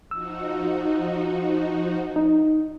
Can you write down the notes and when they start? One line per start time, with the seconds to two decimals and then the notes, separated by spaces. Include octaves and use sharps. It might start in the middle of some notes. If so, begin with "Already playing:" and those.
0.11 F3 D#4 F#4 E6
2.16 D#4